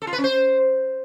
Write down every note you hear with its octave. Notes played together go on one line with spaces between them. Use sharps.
A4
F4
B4
C#4
C5